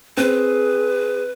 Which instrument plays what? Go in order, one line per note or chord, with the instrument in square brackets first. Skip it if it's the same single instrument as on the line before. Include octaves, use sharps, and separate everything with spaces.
[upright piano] C4 [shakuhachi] G#4 [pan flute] B4